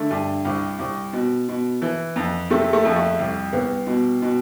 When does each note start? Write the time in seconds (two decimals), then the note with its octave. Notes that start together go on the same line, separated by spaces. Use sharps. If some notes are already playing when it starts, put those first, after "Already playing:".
Already playing: D3 A3
0.11 G2
0.45 C2
0.79 C2
1.13 B2
1.49 B2
1.82 E3
2.16 F2
2.51 C3 A3
2.73 A3
2.85 F2
2.96 A3
3.19 C2
3.53 C2 B3
3.87 B2
4.22 B2